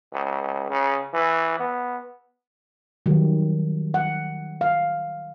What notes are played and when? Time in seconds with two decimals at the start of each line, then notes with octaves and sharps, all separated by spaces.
0.13 C#2
0.70 C#3
1.14 E3
1.60 B3
3.06 D#3 F#3 G3
3.94 F#5
4.61 F5